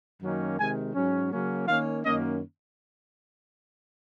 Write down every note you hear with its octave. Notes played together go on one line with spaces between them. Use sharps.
F#2 D#3 F#3 A#3 C#4
C3 D#3 G#3 G#5
G#2 F#3 C#4
C#3 F#3 A#3 C#4
D#3 A#3 C#4 F5
F#2 D#3 A#3 C#4 D#5